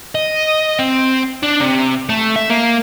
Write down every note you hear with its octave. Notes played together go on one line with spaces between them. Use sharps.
D#5
C4
D4
C3
A3
E5
A#3